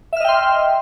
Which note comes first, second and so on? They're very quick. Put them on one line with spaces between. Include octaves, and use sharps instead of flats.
E5 F6 D#5 G5 C6